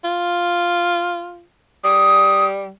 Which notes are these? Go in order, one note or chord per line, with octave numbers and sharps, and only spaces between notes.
F4
G3 D#6